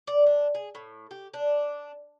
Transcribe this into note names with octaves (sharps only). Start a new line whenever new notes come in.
D5
D4
G#4
A2
G4
D4